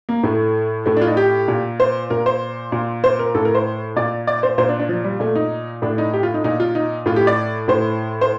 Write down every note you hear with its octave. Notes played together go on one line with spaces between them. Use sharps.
A#3
A2 A3
A2 A3
D4
F4
D#4
G4
A#2
C5
A#2 A#4
C5
A#2
C5
A#4
A2 A4
A#4
C5
A#2 D5
D5
C5
A#2 C5
D4
D4
F3
G3
A#2 A3
D#4
A2 D4
D#4
G4
F4
D#4
A#2 D#4
F4
D#4
A2 F4
G4
D5
A2 C5
C5